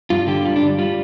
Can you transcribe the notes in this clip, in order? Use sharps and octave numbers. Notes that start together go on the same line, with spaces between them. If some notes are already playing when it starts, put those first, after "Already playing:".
G2 F4
D3 G4
G3 F4
D4
G2
G3 F4